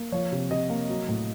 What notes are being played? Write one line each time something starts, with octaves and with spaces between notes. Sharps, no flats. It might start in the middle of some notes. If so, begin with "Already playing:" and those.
Already playing: A#3
F3 C#5
C3
C3 D#5
A#3
F#3
A2